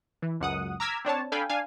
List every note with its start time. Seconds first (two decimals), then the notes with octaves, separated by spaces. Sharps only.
0.22 E3
0.40 C#2 F#2 F#5 D#6
0.80 A#5 D6 E6 F6 G#6 B6
1.05 C4 D4 C#5 A5
1.32 D4 A4 F5 G5 G#5 B5
1.49 D4 F5 G#5